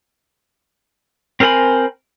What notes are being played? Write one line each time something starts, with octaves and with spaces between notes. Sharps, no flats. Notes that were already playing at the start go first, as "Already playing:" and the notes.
C4 A#4 C5 G#5 B5